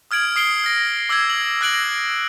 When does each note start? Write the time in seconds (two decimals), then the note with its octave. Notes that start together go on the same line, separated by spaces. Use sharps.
0.11 D#6 F6 G#6 D7 F#7
0.36 D#6 C7 D7 G7
0.64 F6 A#6
1.09 D6 E6 F6 G#6 C7
1.30 F#7
1.61 E6 F#6 A#6 D7 F#7